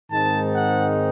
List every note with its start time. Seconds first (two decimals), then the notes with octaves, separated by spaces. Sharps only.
0.10 G#2 D#3 G#3 C4 D#4 A5
0.55 F#5